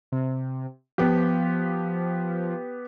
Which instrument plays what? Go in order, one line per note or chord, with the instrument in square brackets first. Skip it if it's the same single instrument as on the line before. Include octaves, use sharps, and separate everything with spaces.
[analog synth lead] C3
[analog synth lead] F3 [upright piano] B3 G4